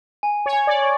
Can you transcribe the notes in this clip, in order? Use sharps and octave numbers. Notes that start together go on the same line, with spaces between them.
G#5
C#5
G#5
D5
C#6